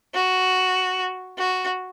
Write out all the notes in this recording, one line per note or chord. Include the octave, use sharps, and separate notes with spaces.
F#4
F#4